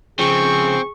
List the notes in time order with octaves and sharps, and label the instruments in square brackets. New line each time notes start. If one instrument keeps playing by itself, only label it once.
[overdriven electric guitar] C#3 F3 [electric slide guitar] C4 [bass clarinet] G#4 [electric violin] C#6